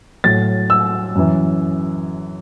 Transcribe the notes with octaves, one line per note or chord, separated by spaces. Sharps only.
A2 F#3 A6
E6
F#2 E3